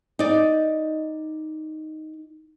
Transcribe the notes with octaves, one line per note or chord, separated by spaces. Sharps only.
D#4 D5